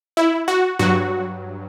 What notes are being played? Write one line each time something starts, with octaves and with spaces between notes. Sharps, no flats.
E4
F#4
G2 F#3 F#4